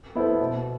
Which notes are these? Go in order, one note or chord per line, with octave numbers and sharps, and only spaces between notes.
B3 E4 A4 C5
B2